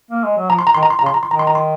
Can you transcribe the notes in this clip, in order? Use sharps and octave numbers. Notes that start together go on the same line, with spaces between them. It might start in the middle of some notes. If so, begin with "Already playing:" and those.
A#3
G#3
F#3
F3 A#5
C6
A#5
D#3 C6
A#5
C6
A#5
C#3
C6
A#5
C6
D#3 A#5
C6
A#5
C6